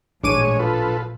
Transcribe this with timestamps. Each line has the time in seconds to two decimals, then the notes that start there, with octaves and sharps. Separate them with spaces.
0.23 A1 A#2 F3 G#3 D4 C#5 D6 D#7
0.59 F4 A4 B4